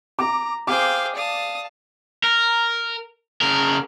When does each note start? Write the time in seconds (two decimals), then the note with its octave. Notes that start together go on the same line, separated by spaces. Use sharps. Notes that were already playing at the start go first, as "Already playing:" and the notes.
0.19 A#5 D6
0.67 G#4 C5 F5 G5 D6
1.15 D5 F5 A5 D#6
2.24 A#4
3.41 C#3 A#4